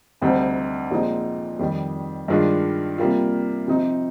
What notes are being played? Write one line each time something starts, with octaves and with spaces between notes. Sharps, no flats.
D2 C3 G3 C4 D#4
A#2 F3 G#3 C4 D#4
F2 D#3 G3
G2 D#3 G#3 D4 F4
C3 G3 A#3 F4
C3 F3 C4 D#4